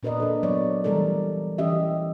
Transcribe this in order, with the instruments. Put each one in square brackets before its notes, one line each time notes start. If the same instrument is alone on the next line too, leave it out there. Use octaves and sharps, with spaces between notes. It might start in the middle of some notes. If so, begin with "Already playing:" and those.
[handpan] A#2 D4 A#4 B4 D5 D#5
D4 A4
F#3 B3 C#5 D5
E3 G3 A3 A4 A#4 D5
E3 C#4 G4 D#5 E5